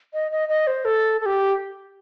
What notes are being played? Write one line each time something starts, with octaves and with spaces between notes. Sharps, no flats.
D#5
D#5
D#5
C5
A4
A4
G4